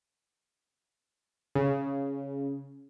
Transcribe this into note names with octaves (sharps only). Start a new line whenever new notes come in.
C#3